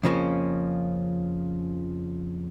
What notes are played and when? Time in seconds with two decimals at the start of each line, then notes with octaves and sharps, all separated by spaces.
0.03 F2 C#3 F3 A#3 C#4